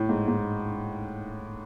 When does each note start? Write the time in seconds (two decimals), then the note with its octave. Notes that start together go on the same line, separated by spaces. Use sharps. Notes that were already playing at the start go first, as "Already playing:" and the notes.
Already playing: A2
0.09 G#2
0.28 G#2